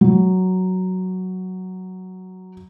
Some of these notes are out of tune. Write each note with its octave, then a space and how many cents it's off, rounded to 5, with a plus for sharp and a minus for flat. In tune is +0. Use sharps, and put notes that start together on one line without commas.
F#3 +5